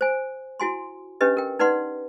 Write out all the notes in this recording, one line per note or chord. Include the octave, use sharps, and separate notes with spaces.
C5 G#5
E4 F#4 G#5 C6
C#4 D4 G4 B4 D#5
A#4 G5
D#4 B4 D5 F#5 C6